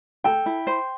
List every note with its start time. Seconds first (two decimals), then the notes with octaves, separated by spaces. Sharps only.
0.24 A4 G5
0.46 E4
0.67 C5